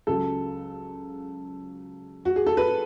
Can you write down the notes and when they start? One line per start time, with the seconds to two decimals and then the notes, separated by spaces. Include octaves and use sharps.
0.07 C#2 C#3 F#3 A4
2.25 F#4
2.36 G#4
2.46 A4
2.57 B4